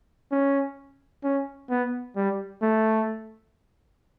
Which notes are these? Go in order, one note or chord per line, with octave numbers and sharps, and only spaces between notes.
C#4
C#4
B3
G3
A3